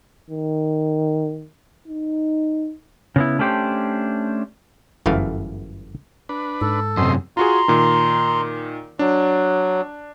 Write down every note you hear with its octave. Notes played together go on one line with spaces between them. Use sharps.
D#3
D#4
C#3 B3 E4
A3 C#4 D4 G4 A4 C5
G1 F#2 E3 A3 F5
D4 B4
G#2 A4
F#2 C3 C5 D#5 C6
F4 F#4 G#4 A#5 C6
A#2 D#3
F#3 D4